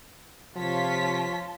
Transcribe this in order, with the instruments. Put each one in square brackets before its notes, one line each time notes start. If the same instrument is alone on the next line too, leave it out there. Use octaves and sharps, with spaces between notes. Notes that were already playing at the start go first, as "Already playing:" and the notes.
[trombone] C3 [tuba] F3 [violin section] F4 C#5 B6 [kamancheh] A5 C6